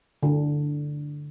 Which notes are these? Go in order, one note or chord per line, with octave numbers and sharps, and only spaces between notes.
D3